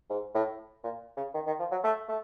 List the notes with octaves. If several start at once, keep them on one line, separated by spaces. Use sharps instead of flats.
G#2
A2
A#2
C#3
D#3
D#3
F3
F#3
A3
A3